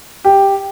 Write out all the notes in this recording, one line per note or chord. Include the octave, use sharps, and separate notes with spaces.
G4